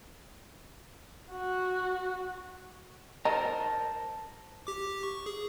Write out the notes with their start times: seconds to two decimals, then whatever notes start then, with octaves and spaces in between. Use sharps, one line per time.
1.32 F#4
3.25 D#4 A#4 C5 A5
4.67 G4 D6
5.03 C#6
5.26 G#4